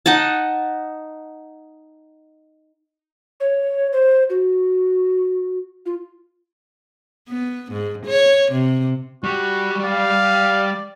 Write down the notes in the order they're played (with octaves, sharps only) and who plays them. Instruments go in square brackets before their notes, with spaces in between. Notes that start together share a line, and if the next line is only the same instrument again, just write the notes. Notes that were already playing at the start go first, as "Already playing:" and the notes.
[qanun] D#4 D#5 F#5 A5
[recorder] C#5
C5
F#4
F4
[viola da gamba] B3
G#2
C#5
C3
[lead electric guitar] G3 G4 [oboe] F#4
[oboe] D5 [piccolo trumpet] F5